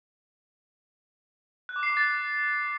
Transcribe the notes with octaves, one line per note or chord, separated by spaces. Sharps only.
F#6
D6
C7
D6
A6